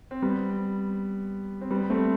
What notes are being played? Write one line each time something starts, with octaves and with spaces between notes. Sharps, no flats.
C4
G3 B3
C4
G3 B3
A3 C4